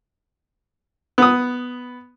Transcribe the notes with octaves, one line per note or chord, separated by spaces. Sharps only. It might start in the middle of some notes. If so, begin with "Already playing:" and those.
B3 D#6